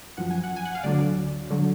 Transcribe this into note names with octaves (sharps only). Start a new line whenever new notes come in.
F#2 F3 F#5
G#5
F#5
G#5
F#5
F5
D2 D3 F#3 D5
D3 F#3